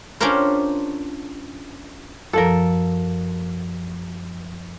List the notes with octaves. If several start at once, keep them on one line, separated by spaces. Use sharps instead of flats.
C#4 D4 F4 G4 A#4 C5
F#2 F3 A4 A#4